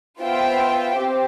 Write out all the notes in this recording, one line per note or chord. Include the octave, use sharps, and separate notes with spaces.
B3 F4 C5 E5 G5
C4 G4 C5